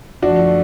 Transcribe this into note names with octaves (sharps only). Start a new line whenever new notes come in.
F#2 D3 F3 A3 D4 F#4